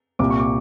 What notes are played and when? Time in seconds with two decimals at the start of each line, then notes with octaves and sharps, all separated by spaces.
0.19 C2 A#2 D6
0.30 C#6
0.39 D6